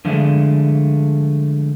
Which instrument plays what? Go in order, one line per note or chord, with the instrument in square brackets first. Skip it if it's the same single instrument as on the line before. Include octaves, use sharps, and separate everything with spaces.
[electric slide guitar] D3 F3 G#3 A3